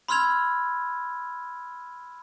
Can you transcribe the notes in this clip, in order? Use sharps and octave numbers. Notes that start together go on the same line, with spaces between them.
B5 C6 E6 F6 G#6 F7